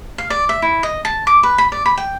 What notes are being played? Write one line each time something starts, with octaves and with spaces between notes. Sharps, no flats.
F5
D5
E5
E4
D#5
A5
D6
B4
B5
D5
B5
G5